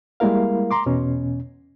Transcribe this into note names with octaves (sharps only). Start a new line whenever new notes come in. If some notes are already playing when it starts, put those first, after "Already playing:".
G3 G#3 A#3 E4 A#4 F5
A#5 C6 D6
E2 B2 C#4